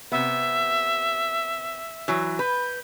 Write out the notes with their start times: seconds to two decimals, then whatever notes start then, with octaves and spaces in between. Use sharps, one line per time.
0.12 C3 B3 E5
2.08 E3 F#3
2.39 B4 G6